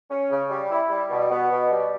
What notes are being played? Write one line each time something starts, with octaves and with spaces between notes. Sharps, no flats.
C#4
C#3
G3
E4
G3
B2
B3
B2
G3